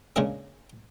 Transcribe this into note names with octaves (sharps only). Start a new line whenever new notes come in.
C#3 G#3 A#3 C#4 D4 G#4